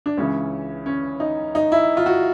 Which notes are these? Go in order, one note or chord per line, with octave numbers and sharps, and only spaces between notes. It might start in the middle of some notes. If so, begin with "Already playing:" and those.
D4
C#2 C#3 E3 C#4
C#4
D#4
D#4
E4
F4
F#4